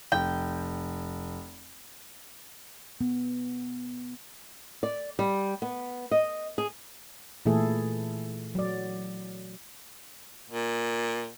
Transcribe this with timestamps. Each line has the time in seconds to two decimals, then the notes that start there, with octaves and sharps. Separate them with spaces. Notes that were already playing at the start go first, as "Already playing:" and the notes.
0.12 F1 G5
3.01 B3
4.83 D5
5.19 G3
5.62 B3
6.11 D#5
6.58 G#4
7.46 A#2 E3 A3 E4 G#4 A4
8.55 F#3 D5
10.50 A#2